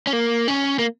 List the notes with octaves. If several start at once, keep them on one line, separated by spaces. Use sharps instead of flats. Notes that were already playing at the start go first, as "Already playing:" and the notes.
C#4
A#3
C#4
A#3